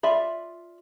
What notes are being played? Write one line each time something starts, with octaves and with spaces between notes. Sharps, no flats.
F4 D5 E5 B5